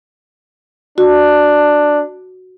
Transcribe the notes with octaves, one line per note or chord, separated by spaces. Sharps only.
D4 F#4